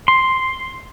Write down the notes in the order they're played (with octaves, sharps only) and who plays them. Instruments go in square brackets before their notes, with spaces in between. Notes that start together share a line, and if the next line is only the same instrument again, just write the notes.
[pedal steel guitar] C6